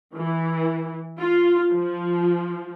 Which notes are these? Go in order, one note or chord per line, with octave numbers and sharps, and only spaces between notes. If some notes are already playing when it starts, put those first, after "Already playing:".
E3
F4
F3